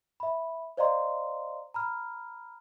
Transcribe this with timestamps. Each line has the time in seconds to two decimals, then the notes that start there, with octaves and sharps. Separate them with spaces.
0.20 E5 B5
0.77 C5 D5 D#5 F5 A#5 C6
1.74 A#5 B5 F6